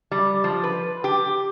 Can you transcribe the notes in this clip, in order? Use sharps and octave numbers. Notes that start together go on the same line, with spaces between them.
G3
F3
B4
G4